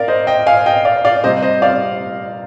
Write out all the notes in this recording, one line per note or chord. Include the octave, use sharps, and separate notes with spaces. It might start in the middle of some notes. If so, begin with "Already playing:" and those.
Already playing: A#4 D5 F5
C5 D#5
D#5 G5
F5 G#5
D#5 G5
D5 F5
D5 F5
C3 G3 C4 C5 D#5
C5 D#5
D5 F5